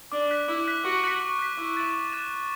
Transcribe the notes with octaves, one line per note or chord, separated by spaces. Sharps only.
D4 D6
F#6 B6
E4 D6
F#6 B6
F#4 C#6
F#6 B6
C#6
F#6 B6
E4 D6
F#6 A6 E7
D6
F#6 A6 E7
F#6